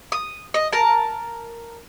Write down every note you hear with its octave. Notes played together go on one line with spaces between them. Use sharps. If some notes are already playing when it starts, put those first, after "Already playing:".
D#6
D#5
A#4 A5